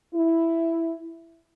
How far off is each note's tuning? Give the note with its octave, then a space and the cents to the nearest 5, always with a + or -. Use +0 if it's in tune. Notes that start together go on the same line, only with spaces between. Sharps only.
E4 +5